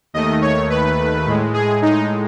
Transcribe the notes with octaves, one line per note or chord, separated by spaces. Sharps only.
D#2 D#3 A3 D#5
C#5
B4
A2 G#3
G#4
D#4